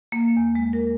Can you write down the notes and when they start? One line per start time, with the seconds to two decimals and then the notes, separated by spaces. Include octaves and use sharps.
0.12 A#3
0.37 E2
0.55 G#3
0.73 A#4